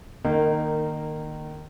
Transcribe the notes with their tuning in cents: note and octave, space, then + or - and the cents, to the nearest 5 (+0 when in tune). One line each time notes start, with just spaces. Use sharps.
D#3 -25 A#3 -10 D#4 +0